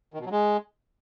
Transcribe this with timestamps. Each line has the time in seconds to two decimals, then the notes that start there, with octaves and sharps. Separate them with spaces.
0.14 D#3
0.20 B2
0.25 F#3
0.31 G#3